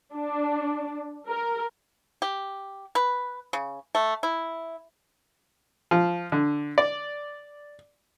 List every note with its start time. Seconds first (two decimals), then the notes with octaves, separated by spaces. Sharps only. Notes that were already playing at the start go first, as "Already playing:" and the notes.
0.15 D4
1.29 A#4
2.22 G4
2.95 B4
3.53 C#3
3.95 A3
4.23 E4
5.91 F3
6.32 D3
6.78 D5